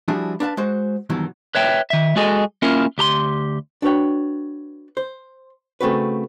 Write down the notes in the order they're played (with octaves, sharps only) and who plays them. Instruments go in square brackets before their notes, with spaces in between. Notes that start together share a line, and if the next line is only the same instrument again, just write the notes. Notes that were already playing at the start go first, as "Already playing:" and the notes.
[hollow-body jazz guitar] F3 G3 D4 E4 F#4 G#4
D4 B4 F5 A5
G#3 F#4 C5
G2 B2 D#3 E3 F#3
[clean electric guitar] B4 C#5 E5 G5
D#3 E5
G#3 F#4 G#4 A4 D#5
A#3 C#4 E4 F4 A#4
D2 G4 A#5 C6
[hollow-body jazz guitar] D4 F#4 B4 C#5 G5
C5
C#3 A3 C4 F#4 B4